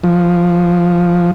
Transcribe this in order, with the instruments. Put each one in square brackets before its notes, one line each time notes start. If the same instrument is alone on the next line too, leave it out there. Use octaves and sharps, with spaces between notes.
[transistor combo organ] F3